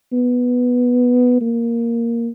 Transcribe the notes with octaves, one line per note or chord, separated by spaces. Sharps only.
B3
A#3